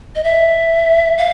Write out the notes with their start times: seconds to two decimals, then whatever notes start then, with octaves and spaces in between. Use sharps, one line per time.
0.15 D#5
0.24 E5
1.18 F5